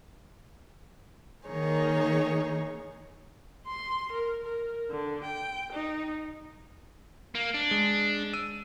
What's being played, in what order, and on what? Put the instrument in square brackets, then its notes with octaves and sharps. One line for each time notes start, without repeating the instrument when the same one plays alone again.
[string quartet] D#3 A#3 D#4 G#4 C#5
[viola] C6
A#4
A#4
D3
G5
D#4
[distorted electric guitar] A#3
D4
[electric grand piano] G#3
E6 D#7